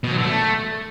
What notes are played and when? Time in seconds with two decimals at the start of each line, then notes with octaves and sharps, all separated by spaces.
0.04 B2
0.11 F#3
0.18 D3
0.25 A3